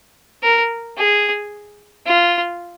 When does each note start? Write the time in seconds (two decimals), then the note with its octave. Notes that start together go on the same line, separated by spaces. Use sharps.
0.43 A#4
0.97 G#4
2.06 F4